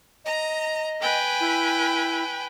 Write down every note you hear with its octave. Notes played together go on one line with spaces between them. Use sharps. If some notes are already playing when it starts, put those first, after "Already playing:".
D#5 A#5
B4 G5 G#5
E4